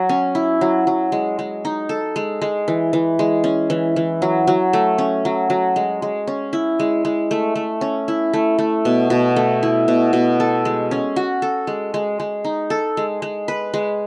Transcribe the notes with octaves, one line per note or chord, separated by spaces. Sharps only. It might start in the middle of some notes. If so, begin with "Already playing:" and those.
Already playing: F#3
C#4
E4
F#3
F#3
G#3
G#3
D#4
A4
G#3
G#3
E3
E3
G#3
C#4
E3
E3
F#3
F#3
A3
C#4
F#3
F#3
G#3
G#3
C#4
E4
G#3
G#3
A3
A3
C#4
E4
A3
A3
B2
B2
A3
E4
B2
B2
A4
G#3
C#4
F#4
A4
G#3
G#3
G#3
D#4
A4
G#3
G#3
B4
G#3